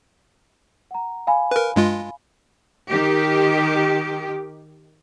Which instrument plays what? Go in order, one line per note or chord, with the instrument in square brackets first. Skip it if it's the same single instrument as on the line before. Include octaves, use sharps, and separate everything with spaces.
[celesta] F#5 A#5
F5 G#5 B5
[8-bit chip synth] A#4 B4
G2 G#3 F4
[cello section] D#3 G4